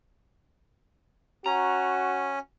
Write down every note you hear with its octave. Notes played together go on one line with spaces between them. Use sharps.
C#4 F#4 A#5